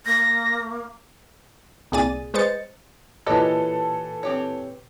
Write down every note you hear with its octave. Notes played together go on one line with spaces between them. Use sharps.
A#3 A#6
C2 A#2 G#4 D5 A6 D#7
G#3 B4 C5 D#5 A6 C#7
A#2 E3 G4 A4 B4 C#5 D#5
C4 G4 C#5